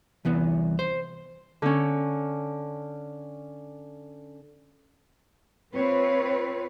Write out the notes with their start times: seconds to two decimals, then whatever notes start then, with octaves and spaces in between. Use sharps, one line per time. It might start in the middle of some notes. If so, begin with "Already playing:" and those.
0.25 C2 E3 B3
0.79 C5
1.62 D3 C#4
5.74 C4 F4 B4 C#5